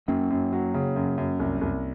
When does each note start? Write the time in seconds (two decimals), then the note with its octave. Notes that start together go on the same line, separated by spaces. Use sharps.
0.08 F#2 A#3 C#4
0.30 F#2
0.53 F#3
0.74 C#3
0.96 F#2
1.18 F#2
1.40 C2
1.61 C2